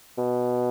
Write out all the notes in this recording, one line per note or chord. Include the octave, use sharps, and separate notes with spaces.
B2